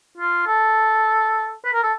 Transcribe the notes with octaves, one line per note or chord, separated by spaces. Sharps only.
F4
A4
B4
A#4
A4